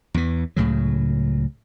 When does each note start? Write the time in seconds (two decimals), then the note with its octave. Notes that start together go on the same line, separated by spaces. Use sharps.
0.14 E2 E3
0.56 C#2 A2 C#3 F#3